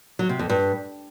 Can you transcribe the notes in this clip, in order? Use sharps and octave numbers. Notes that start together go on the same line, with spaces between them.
F#3
C3
F2
G2